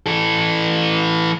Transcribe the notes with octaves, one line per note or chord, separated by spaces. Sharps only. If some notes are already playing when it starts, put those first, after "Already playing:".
E3 A4